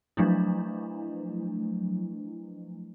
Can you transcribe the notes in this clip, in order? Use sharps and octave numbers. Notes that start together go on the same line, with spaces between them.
F3 F#3 A3 D4 E4